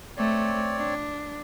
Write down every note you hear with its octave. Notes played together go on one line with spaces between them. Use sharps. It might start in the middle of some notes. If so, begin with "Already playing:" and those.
A3 C4 C#5 D5
D4